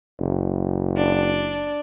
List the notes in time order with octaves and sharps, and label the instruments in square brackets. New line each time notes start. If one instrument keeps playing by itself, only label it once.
[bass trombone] F#1
[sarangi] D4